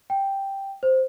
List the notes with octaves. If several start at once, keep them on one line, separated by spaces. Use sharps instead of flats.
G5
C5